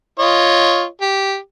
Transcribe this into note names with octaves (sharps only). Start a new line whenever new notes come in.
F4 C#5 D#5
G4